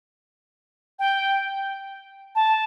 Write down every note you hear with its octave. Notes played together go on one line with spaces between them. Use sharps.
G5
A5